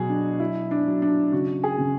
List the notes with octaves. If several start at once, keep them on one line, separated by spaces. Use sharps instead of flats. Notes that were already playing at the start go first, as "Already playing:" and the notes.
Already playing: B2 F#3 F#4 G#4
D4
F#3 E4
D4
F#3
D4
C#3 F#4
G#4
C#3